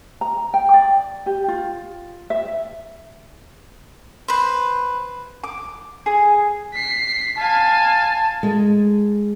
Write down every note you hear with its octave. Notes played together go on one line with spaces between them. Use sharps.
A#5
G5
D5
G4
F4
E5
B4 C5
D6
G#4
B6 C7
F5 G#5 A5
G#3